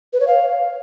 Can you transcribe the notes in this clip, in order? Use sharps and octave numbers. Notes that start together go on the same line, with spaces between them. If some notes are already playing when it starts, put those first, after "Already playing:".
B4
C#5
F5